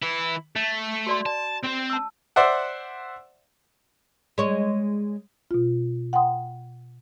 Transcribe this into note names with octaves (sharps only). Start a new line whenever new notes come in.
E3 E4
A3
F#4 D5 C6
D5 A5
C4 C5
A5 E6
C5 D5 E5 F#5
G#3 C#5
B2 F4
F#5 G5 A#5 C6 D#6